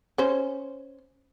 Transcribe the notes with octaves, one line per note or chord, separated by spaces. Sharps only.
C#4 C5